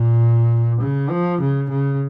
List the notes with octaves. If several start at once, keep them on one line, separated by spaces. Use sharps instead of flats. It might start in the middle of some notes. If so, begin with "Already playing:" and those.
Already playing: A#2
C#3
F3
C#3
C#3